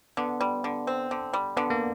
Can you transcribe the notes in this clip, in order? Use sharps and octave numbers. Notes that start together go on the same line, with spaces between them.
D3 B3
G3
D3
C4
D3
G3
D3 B3
A#3